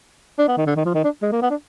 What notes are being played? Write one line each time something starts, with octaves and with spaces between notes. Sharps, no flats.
D4
B3
D#3
D3
D#3
F3
D#3
D4
G#3
A#3
B3
D4